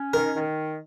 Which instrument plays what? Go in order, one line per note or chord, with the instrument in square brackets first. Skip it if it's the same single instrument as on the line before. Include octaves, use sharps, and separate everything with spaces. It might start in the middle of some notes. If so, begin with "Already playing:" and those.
Already playing: [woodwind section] C#4
[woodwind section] D#3 [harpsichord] A#4
[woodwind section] D#3